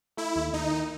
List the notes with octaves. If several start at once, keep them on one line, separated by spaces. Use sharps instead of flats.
A3 E4
D#2
D#2 D#4
D#3